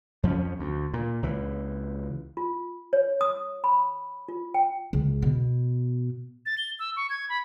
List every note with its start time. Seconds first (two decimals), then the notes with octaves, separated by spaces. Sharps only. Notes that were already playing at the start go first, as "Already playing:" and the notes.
0.23 F2 F3 A3 C#4
0.59 D2
0.93 A#2
1.23 C#2 E3
2.37 F4
2.93 C#5
3.21 D#6
3.64 B5
4.29 F4
4.54 G5
4.93 C#2
5.22 B2
6.46 A6
6.58 G7
6.79 E6
6.96 C#6
7.10 G#6
7.29 B5